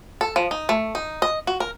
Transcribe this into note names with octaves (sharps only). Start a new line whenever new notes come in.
A4
F3
D#4
A3
D#4
D#5
F#4
A#4